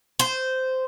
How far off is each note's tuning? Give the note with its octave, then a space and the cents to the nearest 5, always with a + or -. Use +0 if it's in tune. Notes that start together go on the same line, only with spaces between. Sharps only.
C5 -10